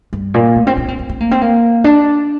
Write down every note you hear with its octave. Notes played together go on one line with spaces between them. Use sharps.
G2
A#2
A3
C4
D4
C4
C4
C4
A#3
C4
A#3
D4